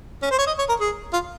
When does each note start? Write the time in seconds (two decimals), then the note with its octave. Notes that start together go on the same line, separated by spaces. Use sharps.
0.23 C#4
0.31 C5
0.39 C#5
0.47 D#5
0.59 C#5
0.69 A#4
0.80 G#4
1.13 F4